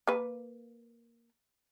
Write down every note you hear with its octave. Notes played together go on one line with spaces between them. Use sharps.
A#3 B4